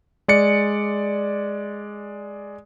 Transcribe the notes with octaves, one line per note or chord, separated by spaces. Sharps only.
G#3 D5 C#7